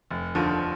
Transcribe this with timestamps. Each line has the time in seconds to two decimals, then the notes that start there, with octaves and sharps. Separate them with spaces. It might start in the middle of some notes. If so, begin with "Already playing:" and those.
0.11 F1
0.35 D#2 D3 F3